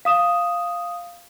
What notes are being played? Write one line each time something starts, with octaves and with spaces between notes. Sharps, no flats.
F5 D#6 E7